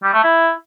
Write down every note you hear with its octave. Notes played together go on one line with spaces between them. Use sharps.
G3
A3
E4